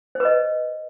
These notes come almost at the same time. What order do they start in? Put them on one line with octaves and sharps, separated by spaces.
C5 B4 D#5